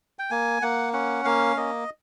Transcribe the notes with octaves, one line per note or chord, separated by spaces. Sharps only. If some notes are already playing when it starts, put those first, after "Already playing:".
G5
A#3 G#5
A#3 F#5
C#4 F#5
A#3 F5
A#3 D#5